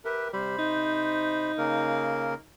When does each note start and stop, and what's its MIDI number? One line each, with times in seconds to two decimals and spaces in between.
0.05 0.28 67
0.05 0.29 70
0.05 0.28 71
0.05 0.28 76
0.33 1.52 48
0.33 0.56 55
0.33 1.52 72
0.33 1.52 83
0.58 2.45 63
1.58 2.34 49
1.58 2.34 58
1.58 2.34 70